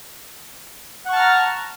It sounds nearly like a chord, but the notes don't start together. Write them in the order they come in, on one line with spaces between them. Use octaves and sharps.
F#5 C#6 A5 F6 A#5